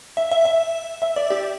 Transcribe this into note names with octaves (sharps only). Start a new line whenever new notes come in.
E5
E5
E5
E5
D5
G4